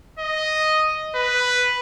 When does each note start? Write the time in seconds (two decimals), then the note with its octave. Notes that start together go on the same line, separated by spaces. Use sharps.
0.19 D#5
1.16 B4